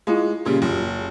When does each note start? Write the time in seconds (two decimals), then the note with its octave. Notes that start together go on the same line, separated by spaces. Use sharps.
0.07 G#3 E4 F4 F5
0.45 A#2 C#3 G3
0.62 F#1 F4